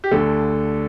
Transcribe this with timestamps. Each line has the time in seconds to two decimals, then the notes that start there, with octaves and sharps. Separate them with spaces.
0.04 G4
0.11 D2 D3 A4